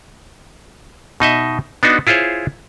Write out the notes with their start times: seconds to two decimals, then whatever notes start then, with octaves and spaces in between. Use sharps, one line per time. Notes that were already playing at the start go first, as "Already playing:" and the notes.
1.20 B2 D#4 D#5 E5
1.83 B3 D4 D#4 F#4
2.07 E4 F4 G#4 C5 C#5